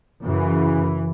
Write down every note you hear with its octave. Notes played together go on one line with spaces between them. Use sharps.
F#2 C#3 E3